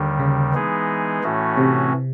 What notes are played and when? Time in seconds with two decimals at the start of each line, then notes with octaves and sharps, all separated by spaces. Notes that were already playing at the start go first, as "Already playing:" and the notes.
Already playing: D#2 D3 D#3 G3
0.19 C#3
0.54 E3 G#3 B3 D#4 G#4
1.23 A2 E3 A3 C#4 F#4
1.58 C3